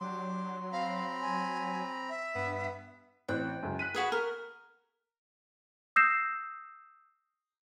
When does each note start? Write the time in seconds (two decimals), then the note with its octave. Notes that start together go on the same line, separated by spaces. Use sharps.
0.01 F#3 D4 G4 C6 D6
0.72 C4 F5 A#5 B5
1.21 G#5
2.09 E5
2.35 G2 B3
3.28 A1 C4 G5 F#6
3.63 C#2 F#2
3.79 F#6 B6 D#7
3.95 F#4 G#4 B4
4.12 A#4
5.96 D#6 E6 G6 A#6 C7 E7